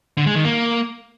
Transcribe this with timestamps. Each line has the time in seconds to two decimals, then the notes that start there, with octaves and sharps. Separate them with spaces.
0.17 D3
0.26 G#3
0.35 D#3
0.44 A#3